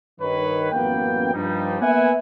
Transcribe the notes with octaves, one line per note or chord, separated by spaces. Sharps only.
G2 D#3 B4 C#5
A1 F#2 A#3 B3 G5
G2 F3 G3 D#4
A#3 B3 B4 E5 F#5 G#5